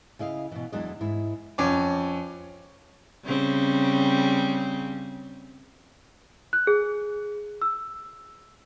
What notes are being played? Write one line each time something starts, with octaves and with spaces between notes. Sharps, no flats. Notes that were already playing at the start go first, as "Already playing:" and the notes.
C#3 E4 D#5 F5
B2 E3
E2 E3 F#3 G#3 D4 D#5
G#2 E4
F2 C#4 D6
C#3 G3 C4
F#6
G#4
E6